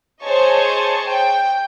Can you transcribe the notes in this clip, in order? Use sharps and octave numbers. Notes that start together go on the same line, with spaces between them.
G#4 C5 C#5 D#5 A5 C#6
G5